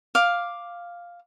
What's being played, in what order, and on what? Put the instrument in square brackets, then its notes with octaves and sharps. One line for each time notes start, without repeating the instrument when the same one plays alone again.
[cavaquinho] F5 D6